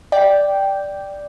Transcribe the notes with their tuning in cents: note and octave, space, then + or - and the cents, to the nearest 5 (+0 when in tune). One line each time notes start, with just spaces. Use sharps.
D5 +0 G5 +0